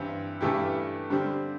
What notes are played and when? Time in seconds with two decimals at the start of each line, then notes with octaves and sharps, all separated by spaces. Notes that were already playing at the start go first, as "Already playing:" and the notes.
Already playing: G2 E3 C4 E4
0.41 G2 E3 A3 E4 G4
1.10 D3 G3 C4